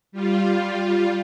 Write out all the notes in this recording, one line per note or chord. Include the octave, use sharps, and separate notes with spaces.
G3 F4